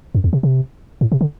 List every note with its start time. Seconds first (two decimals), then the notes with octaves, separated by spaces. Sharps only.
0.15 F#2
0.24 E2
0.33 C3
0.43 C3
1.01 A2
1.12 C3
1.21 D3